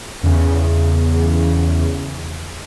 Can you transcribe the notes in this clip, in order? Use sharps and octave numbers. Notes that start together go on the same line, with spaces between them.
E2 C#3